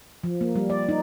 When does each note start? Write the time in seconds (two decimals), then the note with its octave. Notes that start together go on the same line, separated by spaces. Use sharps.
0.24 F3
0.41 A#3
0.55 G3
0.70 D5
0.89 D#4